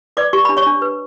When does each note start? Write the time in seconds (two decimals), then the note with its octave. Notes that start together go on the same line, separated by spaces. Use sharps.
0.17 B4 D5 D6
0.33 G4 C#6
0.45 D4 B5
0.57 C#5 C#6
0.67 D4
0.82 B4